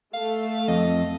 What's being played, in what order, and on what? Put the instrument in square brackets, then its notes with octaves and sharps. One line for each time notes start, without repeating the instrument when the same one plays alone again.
[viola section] A3 [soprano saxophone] F5
[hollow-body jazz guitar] F2 [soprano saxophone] D#5